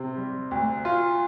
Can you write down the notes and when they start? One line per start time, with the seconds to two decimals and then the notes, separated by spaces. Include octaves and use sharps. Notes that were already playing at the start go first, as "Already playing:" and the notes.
Already playing: C3 C4
0.17 G3
0.51 D2
0.85 F4